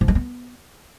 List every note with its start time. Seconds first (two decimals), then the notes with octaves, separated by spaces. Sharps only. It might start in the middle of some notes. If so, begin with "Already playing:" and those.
0.01 F3
0.08 G#3
0.15 B3